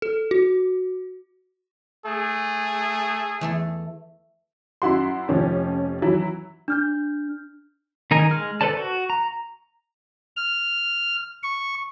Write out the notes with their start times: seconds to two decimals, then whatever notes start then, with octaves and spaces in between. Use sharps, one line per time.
0.02 A4
0.31 F#4
2.06 A3 G#4
3.41 E2 A3 A4
4.82 F#2 E4 F#4 C6
5.28 F1 F3 C#4 G4
6.02 E3 F#3 E4
6.68 D4 F6 G6
8.11 D#3 D#4 A#4 G#5
8.29 G#3 F6
8.61 A4 B4 C5 D5 A5
8.77 F#4
9.10 A#5
10.37 F6
11.43 C#6